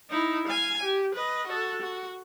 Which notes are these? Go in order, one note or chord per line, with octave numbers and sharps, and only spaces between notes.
D#4 E4
F5 G#5
G4
B4 D#5
F#4 A4
F#4